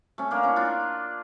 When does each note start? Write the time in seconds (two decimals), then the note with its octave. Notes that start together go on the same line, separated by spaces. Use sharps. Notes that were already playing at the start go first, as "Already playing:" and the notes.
0.18 A3 C#4
0.31 A#3 D4
0.43 C#4 E4
0.56 D4 F4